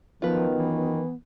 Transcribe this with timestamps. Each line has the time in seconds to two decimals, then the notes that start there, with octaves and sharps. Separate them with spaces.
0.22 F#2 D#3 F3 B3 F4 B4
0.58 E3